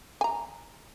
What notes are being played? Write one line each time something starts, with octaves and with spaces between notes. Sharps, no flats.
G#5 A#5